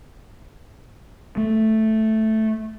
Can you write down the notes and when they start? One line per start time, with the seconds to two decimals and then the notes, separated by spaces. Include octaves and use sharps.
1.37 A3